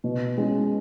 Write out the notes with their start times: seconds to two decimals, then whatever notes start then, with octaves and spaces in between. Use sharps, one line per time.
0.04 B2
0.37 G#3 C#4